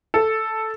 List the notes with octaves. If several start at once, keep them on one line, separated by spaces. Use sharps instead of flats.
A4